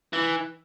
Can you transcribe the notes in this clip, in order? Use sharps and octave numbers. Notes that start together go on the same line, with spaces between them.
E3